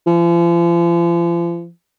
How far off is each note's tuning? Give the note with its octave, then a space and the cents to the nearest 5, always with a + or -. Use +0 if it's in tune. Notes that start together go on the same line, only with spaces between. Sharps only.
F3 -40